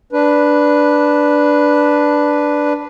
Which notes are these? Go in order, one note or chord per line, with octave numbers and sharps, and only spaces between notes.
D4 B4